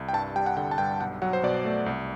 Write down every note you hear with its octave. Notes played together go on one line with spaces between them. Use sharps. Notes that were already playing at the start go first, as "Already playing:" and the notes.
Already playing: C2
G5
G2 A5
G3 G5
F#5
D3 G5
A5
G2 G5
B1 F#5
F#3 F#5
C5
B2 D5
A3
C2